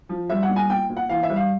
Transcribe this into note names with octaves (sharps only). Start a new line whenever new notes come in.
F3
G3 E5
F#5
A#2
G#5
A#2 G5
A#2
F#5
E3 F5
E5
G3
F5